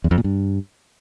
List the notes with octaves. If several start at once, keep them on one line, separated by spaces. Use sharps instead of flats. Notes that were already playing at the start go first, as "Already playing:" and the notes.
E2
F2
A#2
G2